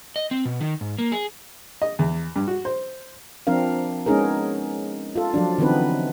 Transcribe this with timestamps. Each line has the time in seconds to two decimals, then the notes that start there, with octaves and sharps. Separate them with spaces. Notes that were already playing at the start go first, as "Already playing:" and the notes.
0.16 D#5
0.31 C4
0.45 B2
0.61 D#3
0.81 G#2
0.98 A#3
1.12 G#4
1.82 D#5
1.99 E2
2.36 G2
2.48 F#4
2.65 C5
3.47 F3 C4 D4 A#4 F5
4.06 G#3 B3 C#4 D#4 G#4 A#4
5.16 F4 A4
5.34 F3 F#3 D4
5.58 D3 E3 B3 C4 D#4 B4